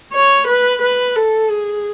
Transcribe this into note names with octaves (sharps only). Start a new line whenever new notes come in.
C#5
B4
B4
A4
G#4